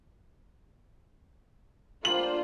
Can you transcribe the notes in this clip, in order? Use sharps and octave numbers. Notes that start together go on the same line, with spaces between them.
D3 G3 A#3 F4 C5 F#7